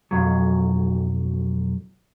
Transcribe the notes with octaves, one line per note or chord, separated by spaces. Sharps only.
B1 F2 F#3